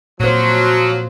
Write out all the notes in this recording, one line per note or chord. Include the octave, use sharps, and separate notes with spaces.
A#2 F3 F#3 C5